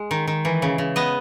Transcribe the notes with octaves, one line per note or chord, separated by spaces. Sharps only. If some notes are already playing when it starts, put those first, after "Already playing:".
Already playing: G#3
D#3
D#3
E3
C#3
C#3
B3 D#5